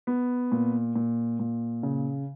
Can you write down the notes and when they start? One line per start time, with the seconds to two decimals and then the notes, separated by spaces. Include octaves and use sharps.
0.07 B3
0.52 A#2
0.96 A#2
1.40 A#2
1.83 C#3